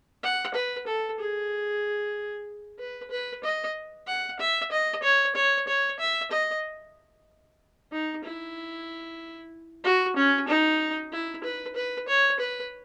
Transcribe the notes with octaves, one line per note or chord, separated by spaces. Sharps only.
F#5
B4
A4
G#4
B4
B4
D#5
F#5
E5
D#5
C#5
C#5
C#5
E5
D#5
D#4
E4
F#4
C#4
D#4
E4
B4
B4
C#5
B4